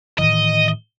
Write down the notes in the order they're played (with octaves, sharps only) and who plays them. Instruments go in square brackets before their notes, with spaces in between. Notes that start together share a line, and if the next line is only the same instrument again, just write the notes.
[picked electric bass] A2 D#3 E3 [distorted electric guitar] D#5